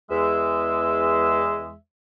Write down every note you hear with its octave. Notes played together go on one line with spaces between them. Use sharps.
E2 G#3 E5